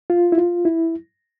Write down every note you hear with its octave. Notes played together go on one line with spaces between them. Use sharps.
F4
E4
F4
E4